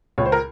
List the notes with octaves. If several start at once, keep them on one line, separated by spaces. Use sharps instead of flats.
C#2 C#5
C5
A#4